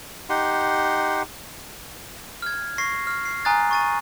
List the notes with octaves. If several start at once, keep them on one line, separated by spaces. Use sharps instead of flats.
D#4 G4 F#5 C6
F6 G#6
C#6 A#6 C7
F6
C7
G#5 A#5 D#6 F#6 A6
C#6 A6 D#7